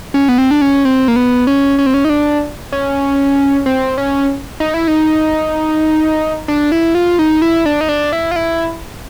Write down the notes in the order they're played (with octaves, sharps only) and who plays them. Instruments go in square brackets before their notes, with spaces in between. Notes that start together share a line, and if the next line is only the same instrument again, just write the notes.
[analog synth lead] C#4
B3
C4
D4
C#4
C4
A#3
B3
C#4
C#4
C4
C#4
D#4
D4
C#4
C4
C#4
D#4
E4
D#4
D4
E4
F4
D#4
E4
D4
D#4
D4
E4
F4
E4